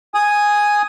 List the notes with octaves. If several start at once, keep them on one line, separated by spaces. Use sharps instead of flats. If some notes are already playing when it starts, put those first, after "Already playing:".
G#5 D#6